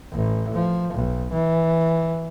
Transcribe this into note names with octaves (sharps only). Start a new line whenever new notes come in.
A1
F3
B1
E3